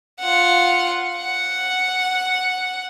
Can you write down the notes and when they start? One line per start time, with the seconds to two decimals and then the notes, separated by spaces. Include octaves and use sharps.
0.21 F4 F#5
1.17 F#5